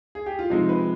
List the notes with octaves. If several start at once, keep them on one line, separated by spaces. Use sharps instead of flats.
G#4
G4
F4
C3 F3 G#3 D#4
B4